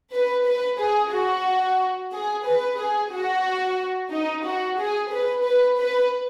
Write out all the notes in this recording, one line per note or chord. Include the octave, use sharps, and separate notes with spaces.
B4
B4
G#4
F#4
G#4
B4
G#4
F#4
D#4
F#4
G#4
B4
B4
B4